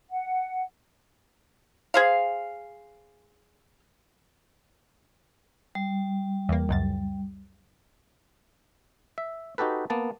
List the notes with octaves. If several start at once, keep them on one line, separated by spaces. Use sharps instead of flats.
F#5
G#4 C5 F5
G3
E2 A#3
C#2 F#2 A6
E5
D#4 F#4 G4 A4 B4
A#3 B3 A5